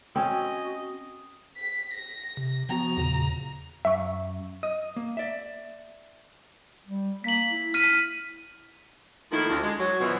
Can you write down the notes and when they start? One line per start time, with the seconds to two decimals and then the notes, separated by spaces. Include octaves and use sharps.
0.16 C4 C#4 F#4 D#5
1.57 B6
1.94 A#6
2.37 C3
2.69 F3 B3 F#4 A#5
2.97 E2 A#2 C#3
3.85 F#2 E5 C#6
4.63 D#5 D#6
4.96 A#3
5.17 D5 E5
6.86 G3
7.24 A#3 B6 F#7
7.51 E4
7.74 F6 B6 D#7
9.31 D#3 F3 A3 A#3 E4
9.50 D2
9.62 G#3
9.79 F#3
10.00 F#2 B2 E3 F3 F#4